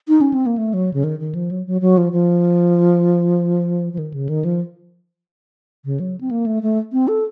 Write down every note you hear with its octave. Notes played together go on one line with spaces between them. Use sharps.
D#4
C#4
C4
A#3
A3
F#3
C#3
D#3
D#3
F3
F#3
F#3
F#3
F3
F3
F3
D#3
C#3
D#3
F3
C#3
F#3
C4
A#3
A3
A3
C4
A4